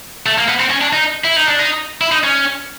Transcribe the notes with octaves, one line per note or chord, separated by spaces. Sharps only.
A3
A#3
B3
C4
C#4
D4
D#4
E4
D#4
D4
D#4
E4
D#4
C#4